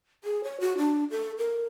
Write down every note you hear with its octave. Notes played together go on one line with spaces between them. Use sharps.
G#4
C#5
F#4
D4
A4
A#4